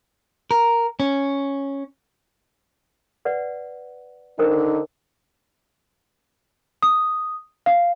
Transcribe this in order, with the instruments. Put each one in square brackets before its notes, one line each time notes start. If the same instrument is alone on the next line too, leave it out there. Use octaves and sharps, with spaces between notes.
[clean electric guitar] A#4
C#4
[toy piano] B4 D5 F#5
[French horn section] D3 D4 D#4 [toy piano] A#4 C5 G5
[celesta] D#6
F5